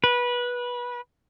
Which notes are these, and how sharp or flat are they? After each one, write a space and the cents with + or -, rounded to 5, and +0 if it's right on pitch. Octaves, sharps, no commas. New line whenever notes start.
B4 -20